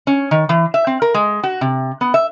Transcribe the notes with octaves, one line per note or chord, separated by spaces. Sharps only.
C#4
D#3
E3
E5
C4
A#4
G#3
F#4
C3
B3
E5